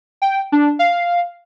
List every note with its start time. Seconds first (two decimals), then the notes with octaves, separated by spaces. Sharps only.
0.22 G5
0.52 D4
0.79 F5